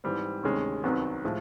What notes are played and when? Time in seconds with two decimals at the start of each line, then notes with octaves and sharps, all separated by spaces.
0.04 G#2 E3 G3 C4
0.43 D2 C3 D#3 G#3 C#4
0.83 C2 C3 D#3 F#3 B3
1.24 A2 F3 G#3